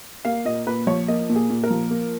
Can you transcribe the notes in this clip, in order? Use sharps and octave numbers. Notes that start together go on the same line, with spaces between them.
A#3 F5
A#2 D#5
A#2 B4
F3 C#5
A#3 D#5
A#2
G#4
A#2
A#4
F3
A#3